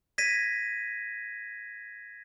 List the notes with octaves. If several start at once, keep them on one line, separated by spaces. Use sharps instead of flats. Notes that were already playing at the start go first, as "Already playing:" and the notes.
G#6 A#6 B6 D#7